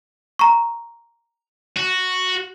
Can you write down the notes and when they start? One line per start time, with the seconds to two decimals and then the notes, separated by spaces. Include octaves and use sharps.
0.39 A#5 C#6
1.77 F#4